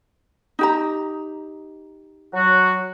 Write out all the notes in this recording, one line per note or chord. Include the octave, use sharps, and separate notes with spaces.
D#4 G4 A#5
F#3 F#4